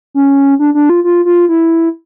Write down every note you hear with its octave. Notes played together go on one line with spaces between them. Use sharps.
C#4
D4
D4
F4
F4
F4
E4